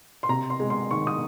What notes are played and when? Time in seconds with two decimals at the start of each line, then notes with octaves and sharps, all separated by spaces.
0.23 C6
0.29 C3 A#5
0.50 C6
0.60 G#3
0.70 C6
0.91 D#3 C#6
1.07 D#6